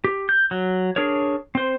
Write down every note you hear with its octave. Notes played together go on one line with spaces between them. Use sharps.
G4
G6
F#3
D4 G#4 A#4 C#5
C4 C5